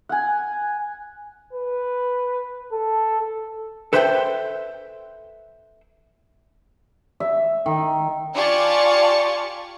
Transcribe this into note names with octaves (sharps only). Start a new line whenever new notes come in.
F#5 G#5
B4
A4
A4 B4 C5 E5 F5 G5
E5
D#3
F4 G4 D5 G#5 A5 C#6